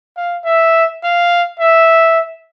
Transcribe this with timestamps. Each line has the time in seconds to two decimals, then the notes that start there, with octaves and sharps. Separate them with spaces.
0.17 F5
0.45 E5
1.03 F5
1.59 E5